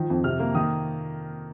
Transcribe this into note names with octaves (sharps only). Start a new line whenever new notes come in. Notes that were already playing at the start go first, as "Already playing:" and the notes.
Already playing: D#3 F3
F2
C3 F6
A#3
D#3 D#6